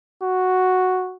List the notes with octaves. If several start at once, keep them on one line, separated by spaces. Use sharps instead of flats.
F#4